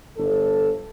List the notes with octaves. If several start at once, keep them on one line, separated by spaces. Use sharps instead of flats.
G1 A4